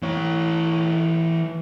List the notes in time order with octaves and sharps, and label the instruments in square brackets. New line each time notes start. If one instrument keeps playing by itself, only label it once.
[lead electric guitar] E3 C#5